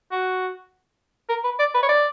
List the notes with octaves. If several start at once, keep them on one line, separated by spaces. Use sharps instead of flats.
F#4
A#4
B4
D5
B4
C#5
D5